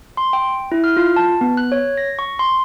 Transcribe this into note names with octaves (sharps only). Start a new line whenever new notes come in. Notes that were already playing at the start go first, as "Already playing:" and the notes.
C6
G5
E4
F6
F4
A5
B3
F#6
C#5
A#6
C#6
C6